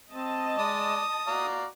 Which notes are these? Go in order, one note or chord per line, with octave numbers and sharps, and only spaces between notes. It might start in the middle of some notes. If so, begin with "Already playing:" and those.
C4 D#5 A5
G#3 D5 D#6
F#4 D5 F5 A#5